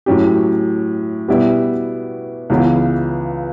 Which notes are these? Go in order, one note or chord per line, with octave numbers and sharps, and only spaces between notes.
A2 F#3 C#4 G4
B2 G3 B3 E4 G4
C#2 C#3 E3 B3